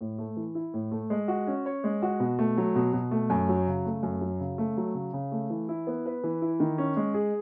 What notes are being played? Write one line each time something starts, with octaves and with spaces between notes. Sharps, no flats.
A2
A3
E3
E4
A2
A3
G#3
F#4
C#4
C#5
G#3
F#4
B2
A3
F#3
B2
B2
A3
F#2
F#3
C#3
A3
F#2
F#3
C#3
A3
F#3
C#3
C#3
A3
E3
E4
B3
B4
E3
E4
D#3
C#4
G#3
G#4